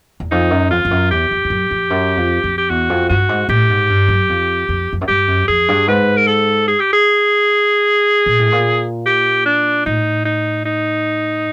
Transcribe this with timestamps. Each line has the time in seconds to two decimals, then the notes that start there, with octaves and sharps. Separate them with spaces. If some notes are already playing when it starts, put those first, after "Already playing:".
0.20 E2
0.31 F2 D#4
0.50 F#2
0.71 F2 F4
0.85 F2
0.91 F#2
1.11 E2 G4
1.31 F2
1.45 F2
1.50 F#2
1.71 F2
1.90 F#2
2.17 F2
2.44 F2
2.58 G4
2.70 E2 F#4
2.90 F2
3.09 G2 F#4
3.29 G#2
3.49 A2 G4
3.69 G#2
3.90 G2
4.08 F#2
4.29 F2
4.69 F2
4.93 F2
5.01 F#2
5.08 G2 G4
5.28 F#2
5.48 F2 G#4
5.68 G2
5.87 G#2 B4
6.17 A#4
6.27 A4
6.68 G#4
6.80 G4
6.93 G#4
8.26 A#2
8.39 A2
8.52 A#2
9.06 G4
9.46 D4
9.86 A2 D#4
10.25 D#4
10.65 D#4